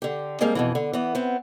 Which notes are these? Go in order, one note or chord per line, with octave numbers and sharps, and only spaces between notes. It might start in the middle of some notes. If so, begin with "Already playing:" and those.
D3 G4
G3 G#3 A#3 C4 D4
F2 B2 E3
D3
E3 B3
B3 C4